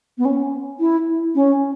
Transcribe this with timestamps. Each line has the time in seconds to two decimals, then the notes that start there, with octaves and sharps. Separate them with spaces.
0.18 B3
0.25 C#4
0.80 E4
1.35 C#4